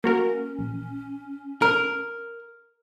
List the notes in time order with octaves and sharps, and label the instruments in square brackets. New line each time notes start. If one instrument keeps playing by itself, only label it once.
[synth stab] A#3 F#4 A#4 [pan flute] C#4
[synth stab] A#1
[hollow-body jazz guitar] A#4 [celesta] F6